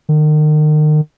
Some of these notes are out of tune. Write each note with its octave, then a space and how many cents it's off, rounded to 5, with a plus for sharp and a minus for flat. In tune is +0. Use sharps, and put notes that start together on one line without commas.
D#3 -35